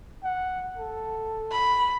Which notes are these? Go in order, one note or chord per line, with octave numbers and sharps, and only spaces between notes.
F#5
A4
B5